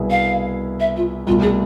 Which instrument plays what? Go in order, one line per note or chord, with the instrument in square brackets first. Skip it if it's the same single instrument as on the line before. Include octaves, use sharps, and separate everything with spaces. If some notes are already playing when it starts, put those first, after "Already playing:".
Already playing: [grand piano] C2 B2 B3 E4 G#4
[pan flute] F5
E5
F4
[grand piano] C2 B2 A3 [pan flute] F4
[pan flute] G#4